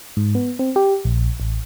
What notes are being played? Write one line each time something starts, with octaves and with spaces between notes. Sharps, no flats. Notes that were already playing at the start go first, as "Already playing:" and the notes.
G#2
B3
C4
G4
A#1
A1